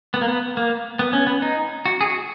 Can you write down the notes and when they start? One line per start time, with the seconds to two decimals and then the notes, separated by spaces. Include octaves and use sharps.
0.14 B3
0.21 A#3
0.28 B3
0.57 A#3
0.99 B3
1.13 C#4
1.27 B3
1.42 D#4
1.86 F#4
2.01 G#4
2.06 F#4